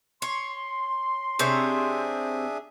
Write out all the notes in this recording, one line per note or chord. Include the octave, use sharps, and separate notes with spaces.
C#5 C6
C3 C4 D4 G#4 C#5 E5